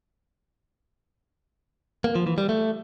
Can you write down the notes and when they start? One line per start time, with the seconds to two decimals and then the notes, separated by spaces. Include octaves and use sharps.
2.04 A#3
2.15 F3
2.27 E3
2.38 G3
2.49 A3